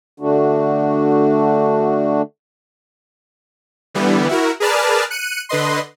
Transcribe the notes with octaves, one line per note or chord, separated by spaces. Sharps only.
D3 A3 D4 F#4
D3 E3 G3 B3
E4 F#4 A#4
G#4 A#4 B4 D5 A5 F6
F#6 C#7 D#7
D3 B4 D#5 C6